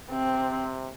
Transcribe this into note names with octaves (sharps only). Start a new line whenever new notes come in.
C3 C4